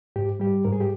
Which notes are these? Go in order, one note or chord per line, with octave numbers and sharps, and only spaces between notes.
G#2 G4
G3 G4
G#2 A#4
G#4
G4